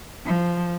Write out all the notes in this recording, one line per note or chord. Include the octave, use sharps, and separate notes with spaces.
F3